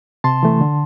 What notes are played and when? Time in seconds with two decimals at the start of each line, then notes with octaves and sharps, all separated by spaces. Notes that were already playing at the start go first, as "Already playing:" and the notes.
0.24 C3 A5 C6
0.43 E3 A3
0.61 D3